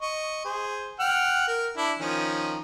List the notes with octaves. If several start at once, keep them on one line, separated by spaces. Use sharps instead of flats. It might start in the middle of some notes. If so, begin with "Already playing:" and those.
D#5 C#6
G#4 C5
F#5 G5 F6
A#4
D4 E4
D#3 F3 C#4